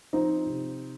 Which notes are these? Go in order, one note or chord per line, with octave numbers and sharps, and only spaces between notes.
F3 C4 D#4
C3